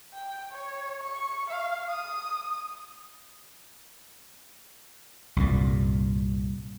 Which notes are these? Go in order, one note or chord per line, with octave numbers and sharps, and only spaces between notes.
G5
C#5
C#6
F5
D#6
C2 G2 A#2